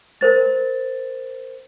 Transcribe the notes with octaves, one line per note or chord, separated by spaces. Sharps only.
A#4 C5 A6